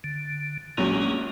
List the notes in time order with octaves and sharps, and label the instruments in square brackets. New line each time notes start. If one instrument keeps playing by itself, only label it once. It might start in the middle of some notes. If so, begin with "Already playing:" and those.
[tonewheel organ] D3
[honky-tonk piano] A#1 F#3 C#4 [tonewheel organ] G#3 A#3